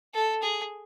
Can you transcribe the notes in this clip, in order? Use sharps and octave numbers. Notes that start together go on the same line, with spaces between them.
A4
G#4